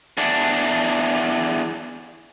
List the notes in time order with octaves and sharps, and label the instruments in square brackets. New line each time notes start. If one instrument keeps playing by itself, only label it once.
[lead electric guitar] E2 D4